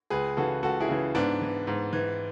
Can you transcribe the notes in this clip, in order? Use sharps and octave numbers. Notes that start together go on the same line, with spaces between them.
C#2 G#4 B4
C#3 E3 F#4 A4
C#2 F#4 A4
E4 G#4
C#3 E3
G#2 B3 D4
E3
G#2
E3